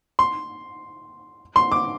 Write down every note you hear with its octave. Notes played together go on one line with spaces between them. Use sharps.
C6
C6
D6